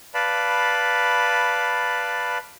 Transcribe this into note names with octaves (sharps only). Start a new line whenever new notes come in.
B4 D5 F5 A5 B5